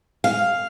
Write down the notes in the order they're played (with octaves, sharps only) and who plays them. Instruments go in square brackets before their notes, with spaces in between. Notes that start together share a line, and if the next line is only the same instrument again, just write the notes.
[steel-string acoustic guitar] F5